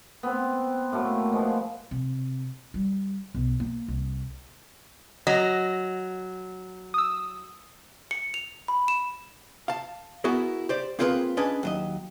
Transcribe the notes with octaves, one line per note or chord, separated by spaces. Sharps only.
B3 C4
A2 F#3 A3 A#3
F3 G#3 A#3 B3
C3
G3
B1
A#3
C2
F#3 D#5 A#6
D#6 E6
C#7
F7
B5
E7
F5 A5
B3 E4 F#4 G#4 A#4
G4 C5 D5
A#3 C4 F4 G#4 A#4 B4
C#4 D4 G#4 B4 D#5
D#2 F#3 D#5